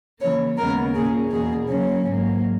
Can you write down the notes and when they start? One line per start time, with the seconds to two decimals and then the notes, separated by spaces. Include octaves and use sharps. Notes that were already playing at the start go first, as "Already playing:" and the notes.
0.20 C#3 E3 A#3 C#5
0.57 D#2 C#3 G#3 B3 A#4
0.94 A#2 A#3 C#4 G#4
1.31 E2 B2 A#3 G#4
1.68 C#3 F#3 A#3 C#4
2.06 G#2 F#3 A#3